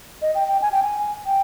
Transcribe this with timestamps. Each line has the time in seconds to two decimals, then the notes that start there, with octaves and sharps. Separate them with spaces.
0.22 D#5
0.35 G5
0.48 G5
0.62 G#5
0.72 G5
0.83 G#5
1.26 G5